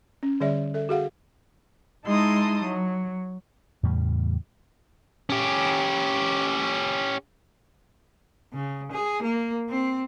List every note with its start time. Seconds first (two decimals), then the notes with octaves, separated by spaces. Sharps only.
0.23 C#4
0.40 D3 G3 G#4 C#5 D5 E5
0.74 A4 E5
0.89 F#4 G#4 F5 F#5
2.05 G#3 D#4 E4 A5 C6 D#6
2.63 F#3
3.83 E2 A2 C#3 G3
5.30 C#4 G4
8.54 C#3
8.92 G#4
9.23 A#3
9.70 C4